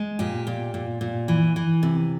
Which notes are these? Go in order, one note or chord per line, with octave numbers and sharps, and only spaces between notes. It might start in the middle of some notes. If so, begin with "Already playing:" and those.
Already playing: G#3
A#2 G4
A#2
A#2
A#2
E3
E3
C3